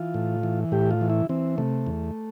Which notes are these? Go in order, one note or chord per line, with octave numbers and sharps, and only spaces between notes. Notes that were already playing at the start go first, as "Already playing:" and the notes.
Already playing: E3 F4
A2
E3
A2 G4
F4
E3
E4
E3 C4
C3 A3
E2